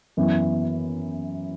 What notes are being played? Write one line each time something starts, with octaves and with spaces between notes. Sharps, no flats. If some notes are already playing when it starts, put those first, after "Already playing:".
F#2 E3 B3